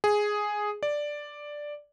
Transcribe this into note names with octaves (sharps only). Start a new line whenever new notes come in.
G#4
D5